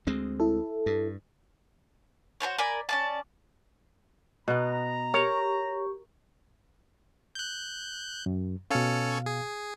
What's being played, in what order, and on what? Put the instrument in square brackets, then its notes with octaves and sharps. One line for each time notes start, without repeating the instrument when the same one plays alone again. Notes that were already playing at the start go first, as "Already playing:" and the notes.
[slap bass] D2 G#3 C4
[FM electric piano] E4 A4
[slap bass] G2
[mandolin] F#4 A#4 C5 C#5
A#4 D5 G#5 B5
C#4 D5 A5
[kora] B2 B3 [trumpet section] A#5
[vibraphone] G4 C#6 [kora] A#4 [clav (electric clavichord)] C#5
[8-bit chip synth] F#6 G6
[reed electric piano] F#2
[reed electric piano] B2 F5 [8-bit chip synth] C#4 A4 C#5
[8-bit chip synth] G#4